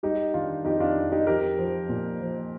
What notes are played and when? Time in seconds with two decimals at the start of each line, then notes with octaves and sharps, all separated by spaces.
0.03 G3 D#4 G4
0.34 D#3 D4 F4
0.65 F2 D#4 G4
0.80 D4 F4
0.96 F2
1.12 D#4 G4
1.27 F3 G4 A#4
1.59 F3
1.89 A#2
2.21 F3